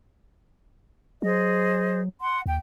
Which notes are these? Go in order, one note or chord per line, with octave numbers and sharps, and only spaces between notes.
F#3 G#4 C5 D#5
F#5 C6
D#2 G5